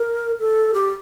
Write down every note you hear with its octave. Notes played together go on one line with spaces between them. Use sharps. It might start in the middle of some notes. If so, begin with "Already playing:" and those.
Already playing: A#4
A4
G4